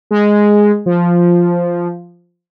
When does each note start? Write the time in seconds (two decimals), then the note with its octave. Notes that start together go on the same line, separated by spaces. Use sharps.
0.11 G#3
0.86 F3